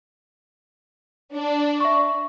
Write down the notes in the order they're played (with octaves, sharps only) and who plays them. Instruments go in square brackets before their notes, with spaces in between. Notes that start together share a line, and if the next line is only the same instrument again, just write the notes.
[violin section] D4
[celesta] E5 C#6